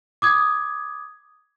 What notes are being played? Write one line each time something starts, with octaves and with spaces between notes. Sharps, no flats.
D6 D#6 G#6